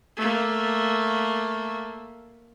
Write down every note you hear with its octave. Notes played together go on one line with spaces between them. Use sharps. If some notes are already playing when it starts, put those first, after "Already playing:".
A3 A#3